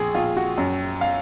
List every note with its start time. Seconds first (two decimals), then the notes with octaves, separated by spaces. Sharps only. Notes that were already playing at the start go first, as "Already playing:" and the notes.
Already playing: A#1 G#4
0.15 A#1 F4
0.37 F#4
0.58 F#2
1.01 F5